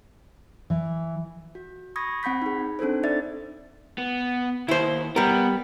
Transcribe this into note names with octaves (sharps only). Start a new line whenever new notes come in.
E3
F#4
B5 C#6 D#6 G#6 A#6
C4 F#5 B5 G6 B6
D#4 G#4
C4 D4 D#4 A4 C5
D#4 D5 E5 A6
B3
D#2 E4 C5
G3 B3 A#4